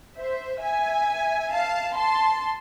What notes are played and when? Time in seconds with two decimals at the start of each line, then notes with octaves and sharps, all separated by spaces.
0.18 C5 E5
0.62 E5 G#5
1.53 F5 A5
1.97 A5 C6